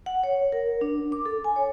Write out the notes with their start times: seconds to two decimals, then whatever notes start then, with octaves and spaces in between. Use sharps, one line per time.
0.06 F#5
0.23 C#5
0.52 A#4
0.81 D4
1.12 D6
1.26 A4
1.44 G#5
1.56 C#5